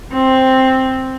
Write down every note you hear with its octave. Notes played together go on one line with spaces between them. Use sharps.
C4